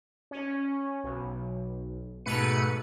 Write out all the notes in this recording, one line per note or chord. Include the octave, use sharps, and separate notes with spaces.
C#4
B1
G#2 B2 A3 B4 C#7 D#7